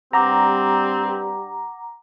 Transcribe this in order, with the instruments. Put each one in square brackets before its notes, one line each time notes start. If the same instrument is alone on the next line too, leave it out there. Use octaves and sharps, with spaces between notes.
[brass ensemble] G2 G3 G4 [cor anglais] C4 [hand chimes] F#5 D6 [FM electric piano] A#5